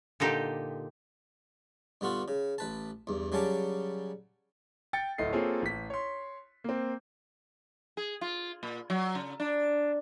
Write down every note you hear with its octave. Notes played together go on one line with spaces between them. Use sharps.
A#2 D3 D#4 G4
G2 D3 B3 F4 F#4
C#3
A1 B4 A5
E2 G2
C#3 F#3 G3 C#4 A5 D6
G5 A6 C#7
D1 A2 A3 D#5 C7
A#3 C4 F4 G#4 A4 C#5
A1 B6
C#5 C6
A#3 C4
G#4
F4
A#2
F#3
C#3
D4